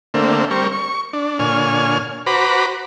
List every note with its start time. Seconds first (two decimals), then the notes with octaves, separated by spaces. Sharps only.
0.14 D3 A3 A#3 C4
0.51 G3 C4 A#4 C#6
0.72 C#6
1.13 D4
1.39 A#2 D3 C#5 G#5 F6
2.26 F#4 B4 C5 A#5 B5 D6